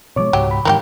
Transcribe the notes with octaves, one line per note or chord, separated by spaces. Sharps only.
B2 F3 G#3 C#5 D6
C#2 G#2 F#3 G4
B5
G#2 D#3 E3 A#3 E4 G4 G5